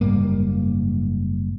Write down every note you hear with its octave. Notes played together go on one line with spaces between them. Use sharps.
F#1 G#2 G3 A#3